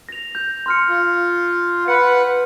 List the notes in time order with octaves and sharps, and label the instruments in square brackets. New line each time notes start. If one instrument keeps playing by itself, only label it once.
[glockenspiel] A#6 F7
G6
C6 F6 C#7
[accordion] F4
[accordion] B4 F#5 [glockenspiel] C#7